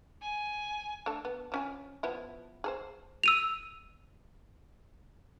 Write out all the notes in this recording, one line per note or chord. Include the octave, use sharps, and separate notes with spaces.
G#5
A3 D4 A4
B3
F3 C#4 G#5
F3 B3 E4
G#4 A4 C5
E6 D#7 F7